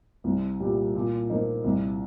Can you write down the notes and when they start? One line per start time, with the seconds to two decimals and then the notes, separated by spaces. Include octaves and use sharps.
0.24 C2
0.60 A#2 G3
0.95 A#2
1.30 F3 A#3 D#4
1.64 C2